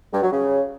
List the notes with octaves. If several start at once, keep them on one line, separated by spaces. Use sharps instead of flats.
G2
F#3
C#3